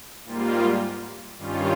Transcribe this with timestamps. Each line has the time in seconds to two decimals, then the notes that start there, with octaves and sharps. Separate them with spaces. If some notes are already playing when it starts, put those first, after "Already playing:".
0.25 G#2 G3 A#3 F4
1.38 G2 D#3 G3 C#4 F4